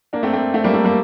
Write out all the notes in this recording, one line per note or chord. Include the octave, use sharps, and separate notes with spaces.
A#3 D4
A3 C4
A3 C4
A3 C4
G3 A#3
A3
G3 A#3